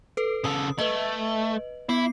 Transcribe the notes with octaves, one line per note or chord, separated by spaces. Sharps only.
A4 B4
C#3 A4 D#6
A3 B4 D#5
B3 E4 C7